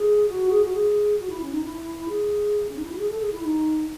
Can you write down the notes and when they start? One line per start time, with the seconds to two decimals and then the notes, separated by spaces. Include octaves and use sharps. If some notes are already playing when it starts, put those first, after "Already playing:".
Already playing: G#4
0.29 F#4
0.51 G#4
0.64 F#4
0.74 G#4
1.19 F#4
1.30 E4
1.41 C#4
1.52 D#4
1.64 E4
2.09 G#4
2.69 C#4
2.77 D#4
2.84 E4
2.91 F#4
2.99 G#4
3.10 A4
3.21 G#4
3.32 E4
3.43 D#4